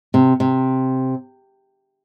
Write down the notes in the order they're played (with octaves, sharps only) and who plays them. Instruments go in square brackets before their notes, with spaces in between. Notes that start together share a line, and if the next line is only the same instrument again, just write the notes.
[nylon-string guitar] C3
C3